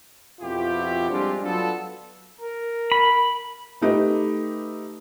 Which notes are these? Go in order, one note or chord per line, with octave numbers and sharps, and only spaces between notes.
F2 B2 E4 F4 G4
G3 G#3 C4 D4 F4 G4
F#3 B3 D4 F4 A4
A#4
B5
A3 D#4 G4 B4